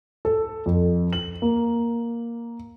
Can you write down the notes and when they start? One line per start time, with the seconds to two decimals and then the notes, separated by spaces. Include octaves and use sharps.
0.25 A4
0.66 F2
1.13 F#7
1.42 A#3